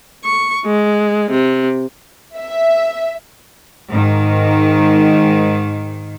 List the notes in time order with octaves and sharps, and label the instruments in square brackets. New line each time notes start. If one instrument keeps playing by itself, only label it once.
[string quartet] C#6
G#3
C3
[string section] E5
[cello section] G#2 D#3